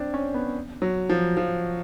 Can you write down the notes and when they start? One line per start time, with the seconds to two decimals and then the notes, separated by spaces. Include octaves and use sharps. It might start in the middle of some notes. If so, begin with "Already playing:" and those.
Already playing: C4 D4
0.14 C#4
0.34 B3
0.82 F#3
1.10 F3
1.37 F3